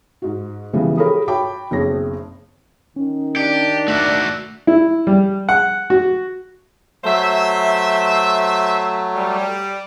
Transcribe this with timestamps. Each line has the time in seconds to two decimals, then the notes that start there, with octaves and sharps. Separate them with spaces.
0.22 G#2 F#4
0.73 C#3 E3 F3 G3 G#3 B3
0.97 G4 G#4 A#4 C#5 B5 D#6
1.28 F#4 C#5 G5 A5 B5 D6
1.71 F#1 B1 C4 G#4 C#5 A#6
2.96 D#3 C#4
3.36 D4 G4
3.88 A3 F#4 E5 F#6
4.67 E4
5.07 G3
5.49 F#5
5.90 F#4
7.04 F#3 A3 C5 E5
9.15 G3